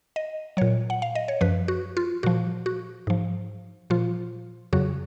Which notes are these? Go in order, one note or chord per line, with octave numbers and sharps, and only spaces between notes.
D#5
A#2 F#3 C#5
F#5
F5
D#5
C#5
F#2 F3 B4
F#4
F4
A#2 F3 F#4
F#4
G#2 F3
A#2 F3 F4
F2 C#3 F#3 F#4